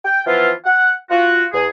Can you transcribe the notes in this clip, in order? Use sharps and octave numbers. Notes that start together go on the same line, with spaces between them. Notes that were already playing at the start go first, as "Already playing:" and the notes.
G5
E3 F3 B3 E4 F4
F#5
F4 F#4
E2 G#4